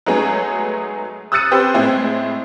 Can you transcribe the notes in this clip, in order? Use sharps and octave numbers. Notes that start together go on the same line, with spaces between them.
F#3 G#3 A3 B3 D#4 G#4
D#6 E6 F#6 A6 C#7 D#7
C4 G4 B4 C5
A2 G#3 C4 E4